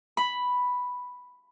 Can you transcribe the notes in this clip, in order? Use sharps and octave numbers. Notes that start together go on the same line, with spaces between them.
B5